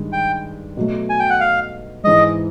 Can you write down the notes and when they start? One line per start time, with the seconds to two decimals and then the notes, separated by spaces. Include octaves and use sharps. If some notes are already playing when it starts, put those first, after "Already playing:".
Already playing: G2 D#3 G#3
0.13 G5
0.77 B2 F#3 A3
1.10 G#5
1.20 G5
1.30 F#5
1.40 F5
2.04 G#2 E3 G#3 D#5